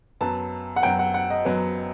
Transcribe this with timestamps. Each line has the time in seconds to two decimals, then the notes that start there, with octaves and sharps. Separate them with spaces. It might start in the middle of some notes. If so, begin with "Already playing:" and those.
0.21 F#2 F#3 B3 A5
0.76 F#5
0.82 F#2 F#3 B3 G5
0.99 F#5
1.14 F#5
1.30 D#5
1.45 F#2 F#3 B3